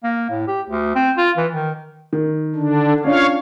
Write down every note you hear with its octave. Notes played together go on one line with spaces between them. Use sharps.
A#3
A2
G4
D2
C4
F4
E3
D#3
D#3
D3 D4
C#4 D4 F4 C#5 F5